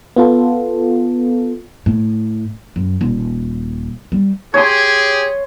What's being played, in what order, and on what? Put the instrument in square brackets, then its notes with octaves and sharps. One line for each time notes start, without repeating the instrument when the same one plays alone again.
[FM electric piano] B3 F4 A4
[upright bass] A2
F#2
D#1
G3
[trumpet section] G4 G#4 [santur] C#5 C6